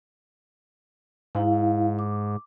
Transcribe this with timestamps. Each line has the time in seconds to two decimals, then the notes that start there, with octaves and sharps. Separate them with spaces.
1.35 G#2 E4 F5
1.99 D6